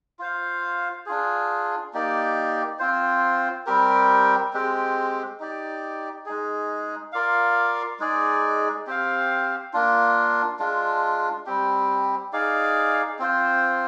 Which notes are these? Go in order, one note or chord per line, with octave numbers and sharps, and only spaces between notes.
F4 C5 F5
D4 F4 G#4
A#3 D#4 G4 D5
C4 F4 C5
G3 C4 G4 A#4
G#3 C4 G4
D#4 G4 D5
G#3 D#4 G#4
F4 A#4 D5 F5
G#3 D#4 G#4 D5
C4 G4 C5 F5
A#3 D4 F4
G#3 D4 F4
G3 C4 G4
D#4 G#4 D5 F5
C4 F4 C5